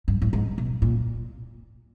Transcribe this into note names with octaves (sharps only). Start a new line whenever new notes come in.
G2
A2
G#2
B2
A#2